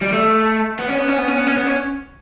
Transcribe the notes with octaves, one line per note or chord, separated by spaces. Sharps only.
G3
A3
B3
C#4
B3
C#4
B3
C#4
B3
C#4
B3
C#4